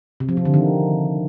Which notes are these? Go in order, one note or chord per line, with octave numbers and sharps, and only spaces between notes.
C3
F3
C3
D3
D#3